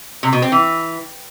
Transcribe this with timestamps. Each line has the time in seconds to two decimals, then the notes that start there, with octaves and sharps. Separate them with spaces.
0.23 C3
0.33 B2
0.42 C4
0.52 E3